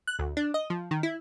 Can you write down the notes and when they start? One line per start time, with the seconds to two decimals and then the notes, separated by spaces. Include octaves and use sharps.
0.07 F#6
0.19 D2
0.37 D4
0.54 D#5
0.70 F3
0.91 D#3
1.03 E4